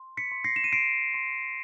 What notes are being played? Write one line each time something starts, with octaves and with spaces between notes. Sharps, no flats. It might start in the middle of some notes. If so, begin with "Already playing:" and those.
Already playing: C6
B6 C#7
C6
A#6 C7
E7
D#7
C6 C7 D7
C6